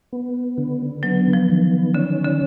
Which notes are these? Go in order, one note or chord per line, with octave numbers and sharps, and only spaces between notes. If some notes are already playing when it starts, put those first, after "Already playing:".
B3
D3
F#3 B3
F3
D#3
D3 C#4
D3